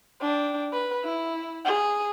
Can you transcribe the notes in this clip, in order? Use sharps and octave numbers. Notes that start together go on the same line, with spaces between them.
D4 G5
B4
E4
G#4